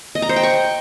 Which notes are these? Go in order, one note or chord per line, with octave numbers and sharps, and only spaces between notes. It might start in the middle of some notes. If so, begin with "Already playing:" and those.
D#5
A#5
C5
G5
C#6